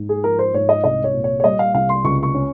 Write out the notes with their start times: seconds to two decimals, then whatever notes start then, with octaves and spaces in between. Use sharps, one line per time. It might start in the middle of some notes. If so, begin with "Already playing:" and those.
Already playing: G#2
0.09 G#4
0.24 F3 A#4
0.39 C5
0.54 G#2 C#5
0.69 D#5
0.84 C2 D#5
1.04 C#5
1.14 A#2
1.24 C#5
1.40 C#5
1.44 G3 D#5
1.59 F5
1.74 C2 F5
1.89 C6
2.04 C#2 C#6
2.23 C#6
2.35 C#4